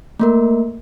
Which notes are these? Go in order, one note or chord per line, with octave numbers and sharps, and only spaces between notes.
A3 A#3 A#4